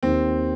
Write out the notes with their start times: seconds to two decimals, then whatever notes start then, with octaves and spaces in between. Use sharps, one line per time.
0.03 D#2 C4